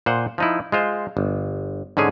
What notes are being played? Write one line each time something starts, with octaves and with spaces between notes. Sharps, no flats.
A#2 C5 F#5
F3 D#4 E4
G#3 F4 C5
G1
G#2 D3 C#4 G#4